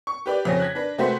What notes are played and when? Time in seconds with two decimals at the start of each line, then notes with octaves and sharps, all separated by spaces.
0.07 C#6
0.26 G4 B4 D5
0.45 F2 C#3 C4 A#6
0.60 F#6 G#6 B6
0.75 D4 B4
0.98 C3 A3 F#4 B4 C5 B6